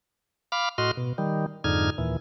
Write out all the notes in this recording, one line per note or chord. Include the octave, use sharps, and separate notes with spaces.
F5 B5 D6 F6
A2 F#4 D#5 C6 F6
B2
D#3 G3
F2 G#2 D3 D#4 F6 G#6
D#2 A#2 E3